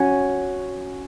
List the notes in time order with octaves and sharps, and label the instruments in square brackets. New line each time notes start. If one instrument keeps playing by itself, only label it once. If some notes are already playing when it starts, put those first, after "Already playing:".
Already playing: [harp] C#4 F#4